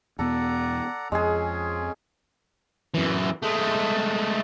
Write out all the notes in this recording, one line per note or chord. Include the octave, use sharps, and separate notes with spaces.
E2 B2 B3 A4 D5 F#5 A#5
F2 G#3 C#4 G#4
F#2 E3
G#3 A3